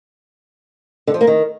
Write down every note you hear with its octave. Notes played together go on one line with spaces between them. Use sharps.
D3
F3
A#3
D#3